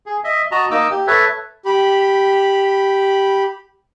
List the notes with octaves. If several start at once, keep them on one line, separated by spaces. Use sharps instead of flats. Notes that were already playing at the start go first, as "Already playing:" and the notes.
G#4
D#5 E5
F#4 D#5 A5 A#5
A#3 D#4 D#5 D6 E6
G4
A4 B4 C#5 E5
G4 B5